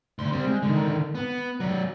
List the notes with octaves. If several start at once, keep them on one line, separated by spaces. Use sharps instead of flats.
D2 C6
G3 C4
G#3
D3 D#3
B3
F#3 D5